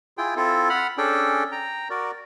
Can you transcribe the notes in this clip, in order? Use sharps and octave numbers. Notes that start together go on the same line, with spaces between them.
E4 F4 G#4 G5
C4 E4 F4 A4
F#5 B5 F6
C#4 D4 G#4 A4 G5
G5 A#5
F#4 A#4 D5